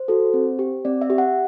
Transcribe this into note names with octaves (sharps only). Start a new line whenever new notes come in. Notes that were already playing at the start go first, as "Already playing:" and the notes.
Already playing: C5
F#4 A4
C4
G4
C4 D5
E5
G4
F#5